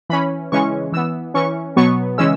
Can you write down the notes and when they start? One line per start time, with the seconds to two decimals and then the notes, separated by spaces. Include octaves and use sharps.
0.09 E3 C#4 B5
0.52 C#3 E3 G#3 C#4 C#6
0.93 E3 B3 E6
1.34 E3 C#4 C#6
1.76 B2 F#3 B3 C#6
2.18 C#3 E3 G#3 C#4 E6